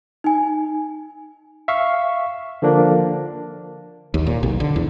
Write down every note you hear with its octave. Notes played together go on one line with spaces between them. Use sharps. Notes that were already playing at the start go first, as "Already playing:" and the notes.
D#4 G#5
E5 F5 C#6
D3 F3 A#3 D4
D#2
A#2
B1
D3
E2